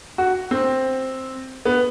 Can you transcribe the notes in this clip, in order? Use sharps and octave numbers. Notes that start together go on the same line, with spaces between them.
F#4
C4
B3